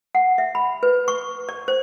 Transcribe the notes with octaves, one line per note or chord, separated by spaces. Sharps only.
F#5
E5
B5
B4
C#6
D5
C5